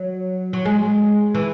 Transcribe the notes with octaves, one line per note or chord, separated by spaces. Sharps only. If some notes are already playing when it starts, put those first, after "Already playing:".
Already playing: F#3
F#3
G#3
E3